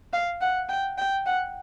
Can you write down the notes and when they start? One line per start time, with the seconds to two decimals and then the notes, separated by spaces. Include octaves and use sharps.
0.13 F5
0.41 F#5
0.69 G5
0.98 G5
1.26 F#5